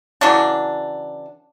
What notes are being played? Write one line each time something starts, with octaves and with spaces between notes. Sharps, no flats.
C#3 E3 F#3 D4